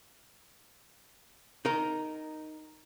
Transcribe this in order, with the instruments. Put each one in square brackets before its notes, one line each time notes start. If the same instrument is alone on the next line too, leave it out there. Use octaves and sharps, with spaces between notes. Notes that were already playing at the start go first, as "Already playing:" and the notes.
[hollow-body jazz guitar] D#4 A#4